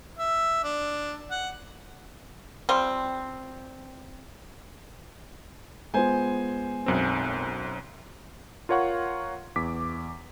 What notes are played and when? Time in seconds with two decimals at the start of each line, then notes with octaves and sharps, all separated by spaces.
0.19 E5
0.64 D4
1.31 F#5
2.69 F3 G3 C4
5.94 G#3 B3 F4 C5 G#5
6.86 B1 F#2 C4
8.69 F4 A#4 C#5 F5 F#5 C#6
9.56 E2 D6 B6